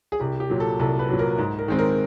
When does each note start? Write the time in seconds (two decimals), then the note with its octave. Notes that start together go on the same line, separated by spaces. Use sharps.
0.12 G#4
0.20 C2 G4
0.40 G4
0.49 A#2 F#3
0.60 A4
0.79 C2 A4
0.99 B4
1.09 A#2 F#3
1.19 A#4
1.38 G#2
1.59 A#4
1.68 D#3 G#3 C4
1.79 A#4